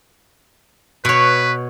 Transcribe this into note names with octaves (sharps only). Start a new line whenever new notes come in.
B2 B4 C#5